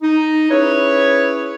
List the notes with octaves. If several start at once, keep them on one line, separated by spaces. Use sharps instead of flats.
D#4
C#4 E4 G#4 B4 C#5